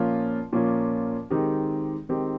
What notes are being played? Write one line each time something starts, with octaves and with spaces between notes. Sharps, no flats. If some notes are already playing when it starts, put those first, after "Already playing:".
Already playing: A#2 F3 A#3 C#4 F4
A#2 F3 A#3 C#4 F4
D#3 G#3 C4 D#4 G4
D#3 G#3 C4 D#4 G4